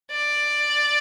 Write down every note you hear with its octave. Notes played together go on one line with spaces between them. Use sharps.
D5